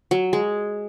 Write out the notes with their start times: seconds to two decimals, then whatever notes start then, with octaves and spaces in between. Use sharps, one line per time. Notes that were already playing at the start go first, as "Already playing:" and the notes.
0.11 F#3
0.33 G#3